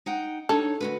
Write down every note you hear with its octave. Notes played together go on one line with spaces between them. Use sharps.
D#4 F#5 G5
D4 D#4 A4 C#5
D2 F#4 B4